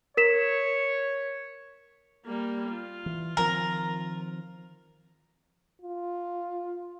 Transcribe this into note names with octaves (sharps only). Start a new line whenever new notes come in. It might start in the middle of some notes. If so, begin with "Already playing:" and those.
A#4 C#5 B6 E7
G3 A#3
F4
E3
D#3 F3 C4 A#4
F4